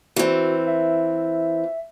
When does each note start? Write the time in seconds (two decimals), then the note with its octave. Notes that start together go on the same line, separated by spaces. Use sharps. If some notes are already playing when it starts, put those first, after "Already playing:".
0.16 E3 C4 F#4
0.67 E5